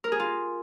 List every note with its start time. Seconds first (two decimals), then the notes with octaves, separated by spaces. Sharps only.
0.04 A#4
0.12 G#4
0.20 F4